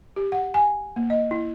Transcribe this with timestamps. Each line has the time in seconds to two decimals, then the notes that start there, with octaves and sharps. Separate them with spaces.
0.16 G4
0.32 F#5
0.54 G#5
0.96 A#3
1.10 D#5
1.31 E4